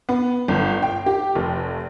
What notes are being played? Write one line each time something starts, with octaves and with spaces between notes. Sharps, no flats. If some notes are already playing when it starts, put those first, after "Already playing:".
B3
G1
G5
G4
F1